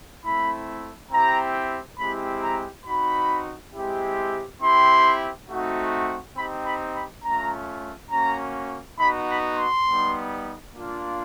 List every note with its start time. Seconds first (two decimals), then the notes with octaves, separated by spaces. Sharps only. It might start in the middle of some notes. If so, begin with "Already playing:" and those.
0.24 A3 C4 E4 B5
1.11 C4 E4 G4 A#5
1.99 G#3 C4 E4 G4 B5
2.43 A#5
2.86 C4 D#4 F#4 B5
3.73 G#3 C4 E4 G4
4.61 C4 E4 G4 C6
5.49 A3 C4 D#4 F#4
6.36 C4 D#4 G4 B5
6.65 B5
6.95 B5
7.23 A3 C#4 F4 A#5
8.10 A#3 C#4 F#4 A#5
8.99 B3 D#4 F#4 B5
9.28 B5
9.57 C6
9.86 G3 B3 D#4
10.73 A#3 D4 F4